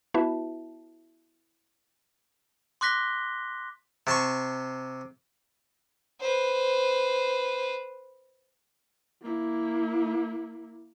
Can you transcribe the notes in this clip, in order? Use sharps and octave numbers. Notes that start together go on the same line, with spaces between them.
B3 E4 F#4 B4 E5 A5
C6 D6 F#6 A#6 B6 G7
C3 A5 C6 C#6
B4 C5
A#3 E4